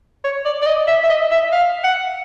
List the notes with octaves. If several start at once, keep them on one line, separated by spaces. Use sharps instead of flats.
C#5
D5
D5
D#5
E5
E5
D#5
E5
F5
F#5